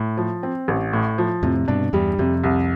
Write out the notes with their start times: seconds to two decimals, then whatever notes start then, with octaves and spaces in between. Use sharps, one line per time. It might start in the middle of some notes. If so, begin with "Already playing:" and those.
Already playing: A2
0.17 F3
0.43 C4
0.68 A1
0.93 A2
1.18 F3
1.43 F2 A2 C3
1.68 G2 B2 D4
1.93 E2 G2 G3
2.18 F2 C3
2.44 C2